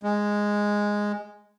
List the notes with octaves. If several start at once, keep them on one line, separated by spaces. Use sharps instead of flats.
G#3